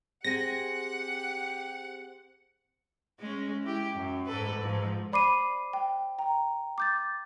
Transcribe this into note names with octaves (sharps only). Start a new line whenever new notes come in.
C4 G4 G#4 F#5 G#5 A#6
G#3 C#4
E4 G4
F#2
G#2 A4 B4
G#2 F3
C5 D5 B5 D6 C7 D#7
G5
G5 A#5
D6 G6 A6